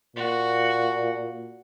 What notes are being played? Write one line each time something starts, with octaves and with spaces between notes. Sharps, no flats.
A#2 F#4